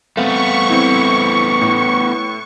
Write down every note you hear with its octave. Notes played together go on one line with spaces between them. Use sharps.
A3 B3 C4 F5 C#6
C4 E4
A2